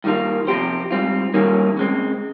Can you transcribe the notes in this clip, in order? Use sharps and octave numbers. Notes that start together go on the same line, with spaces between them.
G2 D#3 G3 A#3 F4
C3 F3 C4 G4 C5
G#2 G3 C4 F4
G2 D#3 G3 A#3 C#4
C#3 G#3 C4